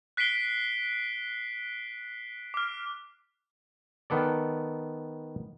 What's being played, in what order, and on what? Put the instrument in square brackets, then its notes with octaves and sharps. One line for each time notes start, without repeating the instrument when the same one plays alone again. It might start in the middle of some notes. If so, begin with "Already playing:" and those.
[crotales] F#6 B6 C7 D7 G7
D6 F6
[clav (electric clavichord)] D#3 B3 A4 D5